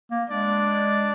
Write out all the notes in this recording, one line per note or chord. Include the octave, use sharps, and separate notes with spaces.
A#3
G#3 D4 D5